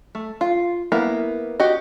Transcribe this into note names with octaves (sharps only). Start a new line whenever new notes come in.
A3
F4
A#3 B3 E4
F#4 G4 D#5